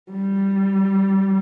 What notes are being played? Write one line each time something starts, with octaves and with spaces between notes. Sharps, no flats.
G3